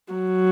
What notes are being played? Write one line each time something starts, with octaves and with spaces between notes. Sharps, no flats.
F#3